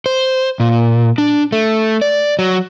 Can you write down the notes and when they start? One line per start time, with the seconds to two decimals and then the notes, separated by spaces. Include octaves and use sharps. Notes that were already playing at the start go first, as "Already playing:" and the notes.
0.06 C5
0.60 A#2
1.18 D4
1.52 A3
2.02 D5
2.39 F#3